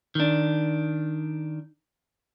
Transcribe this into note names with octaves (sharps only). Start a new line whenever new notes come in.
D#3 D4